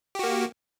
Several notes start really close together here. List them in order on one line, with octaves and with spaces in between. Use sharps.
G4 F#4 A#3